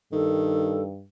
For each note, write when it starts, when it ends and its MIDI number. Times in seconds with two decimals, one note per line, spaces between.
0.13 1.05 43
0.13 0.90 51
0.13 0.82 69